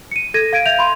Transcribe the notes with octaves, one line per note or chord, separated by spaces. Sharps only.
C#7 D#7
A4 G#6 A#6 D#7
F5 G#6 D7 D#7
E5 F5 G6 F7
B5 C6